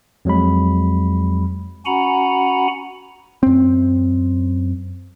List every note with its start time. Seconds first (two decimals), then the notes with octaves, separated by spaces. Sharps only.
0.25 F2 F#3 G#3 B5
1.86 C#4 F#4 F#5 G#5 A#5 B5
3.43 F#2 C4